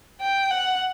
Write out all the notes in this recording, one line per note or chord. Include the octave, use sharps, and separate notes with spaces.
G5
F#5